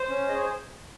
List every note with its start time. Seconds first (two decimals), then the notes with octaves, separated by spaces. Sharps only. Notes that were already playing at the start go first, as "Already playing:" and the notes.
Already playing: C5
0.10 C#4
0.28 G#4 D#5
0.34 C#5
0.42 C5